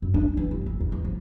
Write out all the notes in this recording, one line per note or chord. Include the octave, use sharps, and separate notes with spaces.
F#2
D4
E3
G1
F2
E2
E2
F3